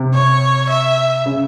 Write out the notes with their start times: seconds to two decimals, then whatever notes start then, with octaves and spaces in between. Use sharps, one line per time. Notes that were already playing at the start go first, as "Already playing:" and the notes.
Already playing: C3
0.14 C#5
0.70 E5
1.26 C#3